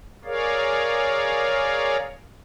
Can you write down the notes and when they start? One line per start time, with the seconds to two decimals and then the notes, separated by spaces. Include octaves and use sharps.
0.25 G#4 A#4 C#5 D5 F5